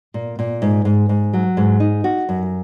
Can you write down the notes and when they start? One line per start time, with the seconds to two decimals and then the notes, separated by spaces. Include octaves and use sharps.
0.14 A#2
0.39 A#2
0.62 G#2
0.85 G#2
1.09 G#2
1.33 F#3
1.57 G#2
1.80 D#4
2.04 F#4
2.29 F#2